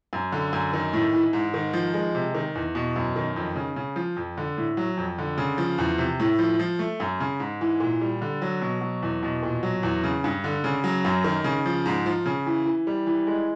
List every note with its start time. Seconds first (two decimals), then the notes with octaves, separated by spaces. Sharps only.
0.13 F#2
0.32 D3
0.53 F#2
0.73 D#3
0.93 A2
1.13 E3
1.33 G#2
1.54 D#3
1.73 F3
1.94 G#3
2.15 C3
2.35 D#3
2.55 E2
2.75 B2
2.96 F#2
3.16 D#3
3.36 F2
3.56 C#3
3.76 C#3
3.96 F3
4.16 F2
4.37 D3
4.57 A2
4.77 F#3
4.97 F2
5.18 D3
5.38 C#3
5.58 F3
5.78 E2
5.98 C3
6.20 A2
6.39 F3
6.59 F3
6.79 A3
7.00 F#2
7.20 C#3
7.40 G#2
7.61 E3
7.80 A#2
8.01 G3
8.22 D3
8.42 F#3
8.61 B2
8.81 F#3
9.02 E2
9.23 B2
9.43 A#2
9.63 F#3
9.83 E2
10.03 C#3
10.24 G2
10.44 D3
10.64 C#3
10.84 F#3
11.05 F#2
11.24 D#3
11.44 C#3
11.66 F3
11.86 G#2
12.06 F3
12.26 C#3
12.46 E3
12.66 E3
12.87 G3
13.07 E3
13.27 G#3